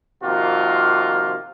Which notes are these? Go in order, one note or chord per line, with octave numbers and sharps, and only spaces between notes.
C3 D#3 F3 A#3 F4 F#4